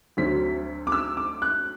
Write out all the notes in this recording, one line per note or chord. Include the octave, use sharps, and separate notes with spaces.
D2 D3 F#3 C4 B6
D6
E6
D6
F#6